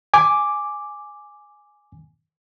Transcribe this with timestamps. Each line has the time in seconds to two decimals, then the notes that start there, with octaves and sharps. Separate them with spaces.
0.14 G#5 D6